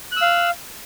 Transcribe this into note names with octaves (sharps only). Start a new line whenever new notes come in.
F5 E6 F#6